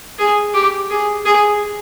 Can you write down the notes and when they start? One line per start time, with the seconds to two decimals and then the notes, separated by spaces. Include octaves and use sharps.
0.19 G#4
0.54 G4
0.90 G#4
1.25 G#4